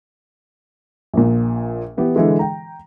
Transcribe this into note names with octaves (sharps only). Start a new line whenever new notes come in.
A#1 A#2
E3 B3 G4
D3 E3 G#3
G5 A#5